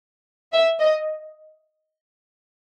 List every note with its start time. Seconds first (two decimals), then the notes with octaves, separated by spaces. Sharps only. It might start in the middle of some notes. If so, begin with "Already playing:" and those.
0.53 E5
0.80 D#5